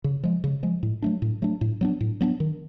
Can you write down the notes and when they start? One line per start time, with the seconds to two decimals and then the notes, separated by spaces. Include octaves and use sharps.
0.04 C#3
0.24 F3 G#3
0.44 C#3
0.63 F3 G#3
0.83 A2
1.02 F#3 A3 D4
1.22 A2
1.42 F#3 A3 D4
1.61 A2
1.81 F#3 B3 D4
2.01 A2
2.21 F#3 B3 D4
2.40 D#3